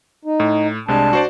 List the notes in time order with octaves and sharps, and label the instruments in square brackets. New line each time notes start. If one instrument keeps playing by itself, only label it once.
[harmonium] D#4
[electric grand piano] A2
[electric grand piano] C2 C3 G#3 [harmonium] D4 A5
[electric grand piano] F#4 C5 D5